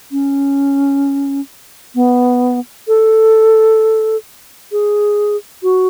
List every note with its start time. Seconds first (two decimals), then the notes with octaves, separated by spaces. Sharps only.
0.12 C#4
1.95 B3
2.88 A4
4.72 G#4
5.63 F#4